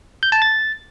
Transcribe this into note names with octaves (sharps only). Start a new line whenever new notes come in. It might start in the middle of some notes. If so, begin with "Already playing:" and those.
G6
A5
A6